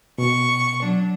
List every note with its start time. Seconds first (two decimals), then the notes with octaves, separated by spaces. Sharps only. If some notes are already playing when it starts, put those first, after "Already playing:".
0.18 B2 C#6
0.80 F#3 D4